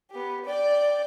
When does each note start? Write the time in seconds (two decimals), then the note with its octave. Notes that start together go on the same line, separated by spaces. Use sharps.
0.11 B3 G4
0.45 D5 G5